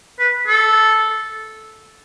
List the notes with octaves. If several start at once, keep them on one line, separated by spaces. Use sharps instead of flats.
B4
A4